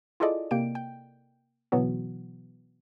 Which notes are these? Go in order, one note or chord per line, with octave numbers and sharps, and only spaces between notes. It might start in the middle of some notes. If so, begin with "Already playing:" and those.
E4 F4 G#4 A4 D5 D#5
C3 A#3 G5 D7
G5
B2 D3 E3 F#3 B3 F#4